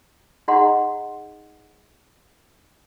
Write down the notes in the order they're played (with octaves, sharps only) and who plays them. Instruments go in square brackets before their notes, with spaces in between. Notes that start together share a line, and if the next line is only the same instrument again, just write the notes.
[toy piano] D#4 G#4 D#5 F#5 A#5 C6